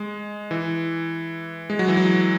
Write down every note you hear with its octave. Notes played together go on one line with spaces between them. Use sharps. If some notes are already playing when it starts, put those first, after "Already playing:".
Already playing: G#3
E3
G#3
F#3
E3
F#3